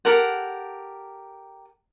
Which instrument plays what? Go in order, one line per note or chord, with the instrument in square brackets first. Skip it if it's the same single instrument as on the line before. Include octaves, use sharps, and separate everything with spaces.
[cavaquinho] G4 A4 A#4 F#5